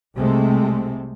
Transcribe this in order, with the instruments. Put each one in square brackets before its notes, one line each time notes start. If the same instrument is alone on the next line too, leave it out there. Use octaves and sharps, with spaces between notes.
[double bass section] C2 C3 G#3 A3 C4